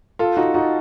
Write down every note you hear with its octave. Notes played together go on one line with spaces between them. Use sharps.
F4 A4
D#4 F#4
D#4 F#4